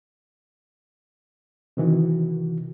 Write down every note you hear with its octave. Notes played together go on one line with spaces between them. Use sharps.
C3 D#3 E3 F#4